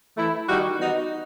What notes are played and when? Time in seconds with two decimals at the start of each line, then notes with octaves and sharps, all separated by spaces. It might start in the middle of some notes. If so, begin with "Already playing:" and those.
0.17 E3 A3 E4
0.48 D#3 G3 D#4 F#4
0.77 E3 B3 D#4 F#4